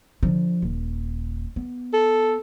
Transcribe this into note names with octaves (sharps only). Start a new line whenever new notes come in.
D3 F3
D#1
B3
A4